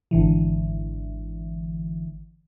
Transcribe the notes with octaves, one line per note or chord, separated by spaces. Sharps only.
G#1 D3 E3